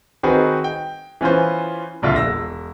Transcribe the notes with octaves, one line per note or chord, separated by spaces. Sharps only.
D#3 C4 D#4 F#4 G#4 B4
G5
E3 B3 C#4 F4 B4 C5
D1 A#1 D3 F4 E5
E1 E6 A#6